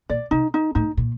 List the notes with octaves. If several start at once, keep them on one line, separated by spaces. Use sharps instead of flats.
A#2 D5
C3 D#4
D#4
A2 D#4
A#2